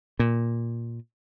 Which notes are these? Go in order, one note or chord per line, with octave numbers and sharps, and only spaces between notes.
A#2